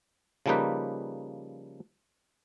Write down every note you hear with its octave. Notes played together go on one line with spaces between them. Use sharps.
C#3 F3 G3 A#3 D#4 B4